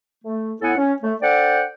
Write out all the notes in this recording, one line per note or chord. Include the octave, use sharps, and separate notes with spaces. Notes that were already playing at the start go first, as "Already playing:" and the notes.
A3
A2 B3 E4 A4 F#5 G#5
C#4
A3
D4 A4 C5 D5 F#5 G5